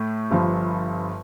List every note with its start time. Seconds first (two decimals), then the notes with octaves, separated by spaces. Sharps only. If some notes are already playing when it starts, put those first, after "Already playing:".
Already playing: A2 A3
0.31 G1 G2 F3